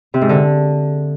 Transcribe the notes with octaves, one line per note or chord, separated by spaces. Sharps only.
C3
G#2
D3